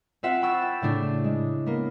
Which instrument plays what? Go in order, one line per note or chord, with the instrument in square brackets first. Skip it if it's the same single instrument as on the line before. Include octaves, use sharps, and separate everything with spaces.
[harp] C4 F4 C5 E5 F#5
G5 B5 C#6 E6 A6
A2 C#3 A3 D4
G#3
A#3 B3